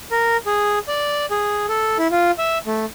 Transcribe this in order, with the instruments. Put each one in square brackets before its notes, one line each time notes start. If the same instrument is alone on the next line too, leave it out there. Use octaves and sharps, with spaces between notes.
[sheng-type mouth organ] A#4
G#4
D5
G#4
A4
E4
F4
E5
A3